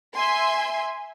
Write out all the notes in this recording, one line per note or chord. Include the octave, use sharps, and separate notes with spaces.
E5 G#5 C6